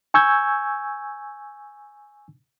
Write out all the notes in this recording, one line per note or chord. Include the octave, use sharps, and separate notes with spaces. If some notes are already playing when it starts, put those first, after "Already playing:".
G#5 C#6 E6 G6 G#6